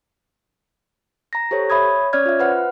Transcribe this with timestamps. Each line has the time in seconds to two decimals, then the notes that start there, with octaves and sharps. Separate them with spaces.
1.33 A#5 A#6
1.51 G4 A4 C5 C#5
1.70 C#5 E5 B5 D#6 G#6
2.13 C#4 C#5 D5 F6 G#6
2.26 F4 E5
2.39 B4 C5 F#5 F6